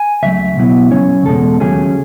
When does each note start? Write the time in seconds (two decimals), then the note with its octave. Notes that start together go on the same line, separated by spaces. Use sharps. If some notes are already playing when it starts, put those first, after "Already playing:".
Already playing: G#5
0.23 C#2 C#3 F#3 A3 E5
0.57 B2 F#3 B3 E4
0.91 C#3 F#3 C#4 C#5
1.26 E2 B2 G#3 A4
1.60 D#2 C#3 F#3 A3 C#4 G#4